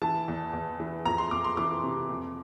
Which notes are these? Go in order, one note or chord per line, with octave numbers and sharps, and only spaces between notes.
E3 A5
E2
E2
E3
F2 A#5
C6
F2 D6
C6
E3 D6
C3
F2